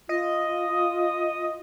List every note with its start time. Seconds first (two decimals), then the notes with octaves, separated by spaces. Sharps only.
0.09 F4 D#5